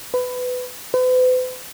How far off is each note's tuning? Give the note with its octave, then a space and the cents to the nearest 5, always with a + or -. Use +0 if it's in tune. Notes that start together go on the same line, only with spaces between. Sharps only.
B4 +20
B4 +45